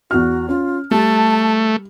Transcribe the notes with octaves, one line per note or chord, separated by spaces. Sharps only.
E2 F#4 F6
C#4 F4
G3 A3 A5